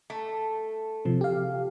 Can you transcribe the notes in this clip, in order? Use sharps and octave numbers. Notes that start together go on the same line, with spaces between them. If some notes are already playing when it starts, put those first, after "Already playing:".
A3
C3 F3 C4
G4 F5